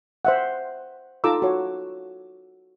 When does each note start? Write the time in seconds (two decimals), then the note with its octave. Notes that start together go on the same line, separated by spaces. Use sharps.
0.25 C5 E5 F#5
1.24 D#4 F4 A4 A#5 D6 E6
1.42 F#4 C#5